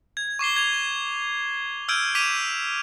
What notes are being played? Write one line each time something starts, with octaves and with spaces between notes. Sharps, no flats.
G#6
C#6 D6 C7 G7
G#6 F7
E6 F6 G6 G#6 D7 D#7
D6 B6 D#7 F7